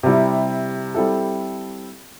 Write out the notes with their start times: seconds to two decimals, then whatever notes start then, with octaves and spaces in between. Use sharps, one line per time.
0.03 C3 G3 E4
0.95 G3 C4 E4 A4